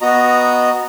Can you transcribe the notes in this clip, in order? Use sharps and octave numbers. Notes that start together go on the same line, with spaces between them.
B3 F#4 D#5 A#5